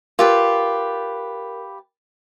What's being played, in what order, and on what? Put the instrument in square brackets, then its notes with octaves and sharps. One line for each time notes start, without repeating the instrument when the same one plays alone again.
[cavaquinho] F4 G4 B4 [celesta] A#4